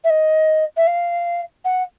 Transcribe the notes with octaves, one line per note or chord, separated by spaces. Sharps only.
E5
D#5
E5
F5
F#5